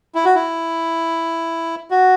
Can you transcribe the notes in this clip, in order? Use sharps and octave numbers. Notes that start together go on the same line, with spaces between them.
E4
F#4
E4
F#4